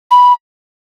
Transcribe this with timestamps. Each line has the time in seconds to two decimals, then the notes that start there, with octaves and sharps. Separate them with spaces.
0.11 B5